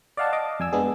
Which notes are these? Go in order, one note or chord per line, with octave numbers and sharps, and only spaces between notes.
D5 D#5 F5 F#5 A5
D#5 D6
F2 G#5 E6
G#3 B3 D4 G#4